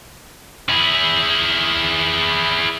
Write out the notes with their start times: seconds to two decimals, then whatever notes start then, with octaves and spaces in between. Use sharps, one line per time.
0.70 E4 G#4